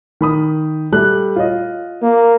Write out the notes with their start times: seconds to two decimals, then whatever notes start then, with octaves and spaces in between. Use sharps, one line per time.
0.21 D#3 B5 D#6
0.92 G3 A3 F#6
1.36 F4 C#5 D#5
2.02 A#3